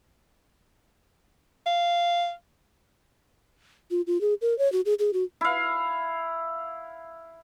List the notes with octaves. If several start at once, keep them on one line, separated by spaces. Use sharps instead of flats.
F5
F4
F4
G#4
A#4
C#5
F#4
G#4
G#4
F#4
E4 F5